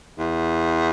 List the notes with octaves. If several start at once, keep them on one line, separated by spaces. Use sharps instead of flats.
E2